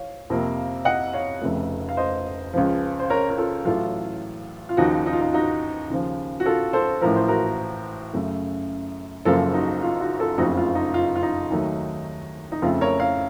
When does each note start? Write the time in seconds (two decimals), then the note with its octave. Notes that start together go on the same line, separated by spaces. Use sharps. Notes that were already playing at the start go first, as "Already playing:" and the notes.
Already playing: C#5 F5
0.30 F2 C3 F3 A#3
0.85 D#5 F#5
1.13 C#5 F5
1.42 F1 F2 C#3 A3
1.89 F5
1.97 C5 D#5
2.53 C#2 C#3 F3
2.99 C5
3.10 A#4 C#5
3.30 A#4
3.38 F4 A4
3.65 A1 A2 F#3 F4 A4
4.69 F4
4.77 D#2 C#3 F3 D#4 F#4
5.06 D#4
5.13 F4
5.21 D#4
5.33 D#4 F#4
5.90 D#2 C#3 F3
6.40 F#4
6.46 F4 A4
6.73 A4 C5
7.01 A1 A2 F3 A#4
7.16 C5
7.28 F#4 A#4
8.13 F#2 C#3 A3
9.25 F#1 F#2 C#3 F3 A#3 F4 A4
9.54 D#4 F#4
9.82 F4
10.00 D#4 F#4
10.20 F4 A4
10.37 F#1 F2 C#3 A3 D#4 F#4
10.57 F4
10.75 D#4
10.94 F4
11.16 F4
11.23 D#4
11.50 D#2 D#3 F#3 A3
12.52 D#4
12.62 F2 C#3 A3 F4
12.81 A#4 C#5
12.99 C#5 F5